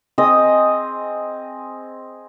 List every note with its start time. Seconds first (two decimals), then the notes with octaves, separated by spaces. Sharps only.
0.18 C4 G#4 D#5 D#6